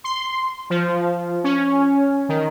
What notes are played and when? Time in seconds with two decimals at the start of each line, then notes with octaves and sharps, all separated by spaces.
0.04 C6
0.70 F3
1.44 C#4
2.29 D#3